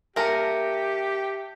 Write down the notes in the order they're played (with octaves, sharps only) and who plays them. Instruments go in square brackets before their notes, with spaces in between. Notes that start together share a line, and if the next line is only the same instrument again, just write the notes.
[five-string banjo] A#3 A#4 [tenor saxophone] G4 [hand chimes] E5 A5 C#7